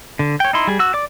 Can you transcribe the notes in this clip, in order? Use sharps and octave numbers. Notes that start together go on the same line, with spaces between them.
D3
C#5 G5
D#4 E4 C6
G3 G#4
F#4 E6
D5 D6